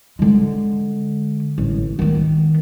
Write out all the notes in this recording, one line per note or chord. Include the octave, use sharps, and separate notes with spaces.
D3 G#3
A1
D#3 B3